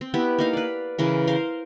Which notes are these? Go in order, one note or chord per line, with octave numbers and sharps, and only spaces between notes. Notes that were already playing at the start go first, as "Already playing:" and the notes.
C4
B3 E4 G4
A#3 D#4 F5
B4 D5
C#3 E3 A#4
A#4 C5 F5